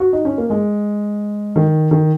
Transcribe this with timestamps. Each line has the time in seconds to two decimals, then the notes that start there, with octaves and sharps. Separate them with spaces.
0.00 F#4
0.13 D#4
0.25 C#4
0.38 A#3
0.50 G#3
1.56 D#3
1.91 D#3